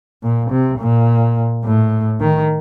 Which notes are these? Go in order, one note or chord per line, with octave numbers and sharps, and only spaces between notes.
A#2
C3
A#2
A2
D#3